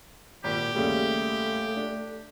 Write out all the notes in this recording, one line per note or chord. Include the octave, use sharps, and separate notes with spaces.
G#1 A#2 G4
D#2 C#3 G3 A3
D4